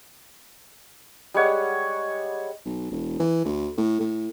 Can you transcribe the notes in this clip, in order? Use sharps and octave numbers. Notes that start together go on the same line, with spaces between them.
G3 G#3 C#5 F#5
B1
E1
E3
D2
A2
A2